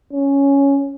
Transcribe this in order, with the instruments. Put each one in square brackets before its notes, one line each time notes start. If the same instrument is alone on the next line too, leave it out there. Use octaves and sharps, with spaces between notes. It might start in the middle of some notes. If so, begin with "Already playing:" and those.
[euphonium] C#4